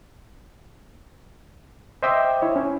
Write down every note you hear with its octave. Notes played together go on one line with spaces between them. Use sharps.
C5 D#5 E5 G5 D6 E6
E4 C#5
C#4